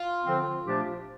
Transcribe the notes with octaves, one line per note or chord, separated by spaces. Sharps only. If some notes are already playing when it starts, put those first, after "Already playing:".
Already playing: F4
D3 F3 C4
A#2 F3 A3 D4 G4